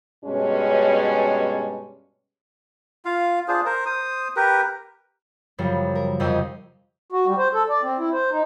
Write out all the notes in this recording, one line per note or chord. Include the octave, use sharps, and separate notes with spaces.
G2 B2 G#3 C#4
F4 F5
D4 F4 G#4 C5
A#4 C5
C5 D#6
G4 A#4 B4
F#2 C#3 F3 G3
A#4
F2 C3 G4 D#5
F#4
G3
C5
A4
D5
C4
E4
C5
D#4